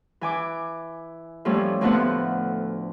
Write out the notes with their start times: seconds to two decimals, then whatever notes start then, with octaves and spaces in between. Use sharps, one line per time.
0.21 E3 G#5 D6
1.45 A2 F3 G3 A3 C#4
1.81 D2 A2 F3 A3 B3 F#5